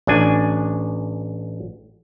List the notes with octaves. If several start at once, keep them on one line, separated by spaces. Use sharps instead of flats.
A1 D4 G#5